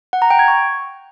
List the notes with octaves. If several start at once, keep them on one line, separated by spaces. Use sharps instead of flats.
F#5
A#5
G5
G#6
C#6